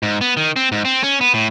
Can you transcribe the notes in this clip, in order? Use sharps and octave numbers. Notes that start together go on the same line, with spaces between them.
G#2
B3
D#3
C4
G#2
C4
C#4
B3
A2